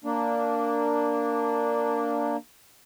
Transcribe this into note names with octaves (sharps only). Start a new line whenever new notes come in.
A#3 D4